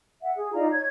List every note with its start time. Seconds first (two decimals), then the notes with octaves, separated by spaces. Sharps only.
0.21 E5 F#5
0.36 G#4
0.53 D#4 F4 D5 A#5
0.71 C#5 G#6